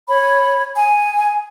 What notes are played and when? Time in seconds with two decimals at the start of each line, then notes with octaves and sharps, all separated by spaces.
0.08 C#5 B5
0.76 G#5